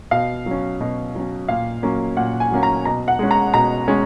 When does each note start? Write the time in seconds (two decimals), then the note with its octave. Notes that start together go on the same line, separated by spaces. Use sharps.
0.11 B2 F5
0.46 F#3 C#4
0.81 B2
1.15 F#3 C#4
1.48 A#2 F5
1.83 F#3 A#3 C#4
2.17 A#2 F#5
2.40 G#5
2.51 F#3 A#3 C#4
2.63 A#5
2.85 B2 A#5
3.08 F#5
3.19 G#3 C#4
3.31 A#5
3.54 B2 A#5
3.88 G#3 C#4